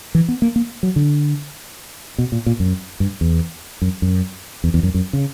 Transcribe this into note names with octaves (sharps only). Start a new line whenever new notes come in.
E3
B3
A#3
A#3
F#3
D3
B2
A#2
A#2
F#2
G2
E2
F#2
F#2
E2
E2
F#2
F#2
C#3